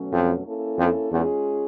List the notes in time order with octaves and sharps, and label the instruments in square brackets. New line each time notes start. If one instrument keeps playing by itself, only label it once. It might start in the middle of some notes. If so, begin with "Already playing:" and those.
Already playing: [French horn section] B2 F#3 A3 C#4
[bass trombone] F2
[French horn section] A#3 C#4 E4 A4
[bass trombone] F2
[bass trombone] E2 [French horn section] G#3 C#4 F4 G#4